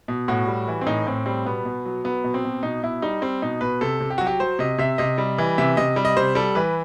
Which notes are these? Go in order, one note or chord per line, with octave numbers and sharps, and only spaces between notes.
B2
A2 F#4
G3
E3
C4
A2 D#4
A2 C4
G3 C4
B2 B3
B2
F#3
F#3 B3
B2
C4
B2
B2 D#4
B2 E4
G3 D#4
G3 C4
B2 D#4
B2 B4
C3 A4
C3
G4
F#4
F#3
G4
F#3 C5
C3 D#5
C3 E5
C3 D#5
G3
E3
C3 E5
C3 D#5
G3
D#5
C3 C5
G3 A4
E3 B4